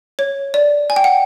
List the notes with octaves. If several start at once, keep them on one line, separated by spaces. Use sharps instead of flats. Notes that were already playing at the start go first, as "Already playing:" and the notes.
C#5
D5
G#5
G5
F#5